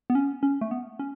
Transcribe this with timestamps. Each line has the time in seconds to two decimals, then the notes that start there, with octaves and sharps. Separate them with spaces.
0.10 B3
0.15 C#4
0.43 C#4
0.61 A3
0.71 B3
0.99 C#4